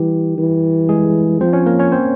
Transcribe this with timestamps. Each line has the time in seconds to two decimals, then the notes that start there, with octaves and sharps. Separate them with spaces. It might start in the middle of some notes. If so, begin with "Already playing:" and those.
Already playing: E3 G3 G4
0.38 E3
0.89 G#3 G#4
1.41 F3 C4 C5
1.53 C#4 C#5
1.66 A#3 A#4
1.79 C#4 C#5
1.92 C4 C5